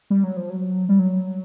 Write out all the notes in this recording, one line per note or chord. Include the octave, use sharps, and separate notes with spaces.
G3
F#3
F3
F#3
G3
F#3